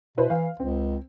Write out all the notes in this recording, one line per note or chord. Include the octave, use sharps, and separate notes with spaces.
B2 E4 B4 C5
E3 F5
C#2 C4